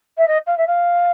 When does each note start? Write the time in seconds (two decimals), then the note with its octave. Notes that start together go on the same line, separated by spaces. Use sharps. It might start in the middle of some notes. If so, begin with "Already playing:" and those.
0.17 E5
0.27 D#5
0.46 F5
0.57 E5
0.67 F5